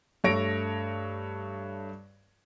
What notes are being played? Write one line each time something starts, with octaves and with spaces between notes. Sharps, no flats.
G2 A3 C#5 A#6 D7